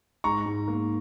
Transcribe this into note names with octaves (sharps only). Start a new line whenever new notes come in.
G#2 A#5 C#6
G#2
A#3